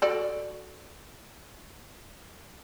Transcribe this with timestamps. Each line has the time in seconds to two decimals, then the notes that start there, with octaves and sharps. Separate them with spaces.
0.02 F#4 A4 D5